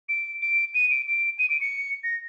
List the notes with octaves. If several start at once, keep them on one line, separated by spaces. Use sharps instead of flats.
D7
D7
D#7
D7
D7
D#7
D7
C#7
A#6